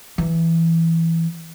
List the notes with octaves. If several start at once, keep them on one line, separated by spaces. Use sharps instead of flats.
E3